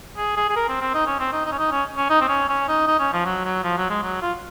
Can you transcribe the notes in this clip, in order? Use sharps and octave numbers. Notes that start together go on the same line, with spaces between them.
G#4
G#4
G#4
A#4
C4
C4
D#4
C#4
C4
D#4
D#4
C#4
D#4
C#4
C#4
D#4
C4
C#4
C#4
D#4
D#4
C#4
F3
F#3
F#3
F3
F#3
G#3
F#3
F4